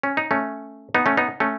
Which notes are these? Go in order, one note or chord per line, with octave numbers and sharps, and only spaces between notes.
C#4
D#4
A3 C#4
B3 D#4
A3 C#4
B3 D#4
A3 C#4